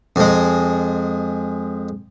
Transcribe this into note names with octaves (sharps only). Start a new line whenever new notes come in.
F2 G#3